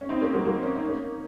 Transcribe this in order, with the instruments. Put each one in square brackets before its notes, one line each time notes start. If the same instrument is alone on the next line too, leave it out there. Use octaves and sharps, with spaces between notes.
[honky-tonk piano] C#4
C4 D#4
A#3 C#4
F#3 A#3
F#3 A#3
C#4
D#4
A#3 C#4